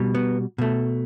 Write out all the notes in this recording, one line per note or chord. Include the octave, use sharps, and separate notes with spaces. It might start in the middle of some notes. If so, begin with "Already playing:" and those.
Already playing: B2 G3
B3
B2 A3